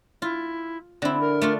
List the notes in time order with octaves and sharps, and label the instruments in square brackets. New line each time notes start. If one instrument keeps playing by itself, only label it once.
[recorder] E4 [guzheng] F4
[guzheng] D3 E4 [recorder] C4
[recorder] A#4
[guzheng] A3 D4 F4